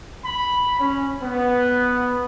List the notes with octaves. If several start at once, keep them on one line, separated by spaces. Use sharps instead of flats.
B5
C#4
B3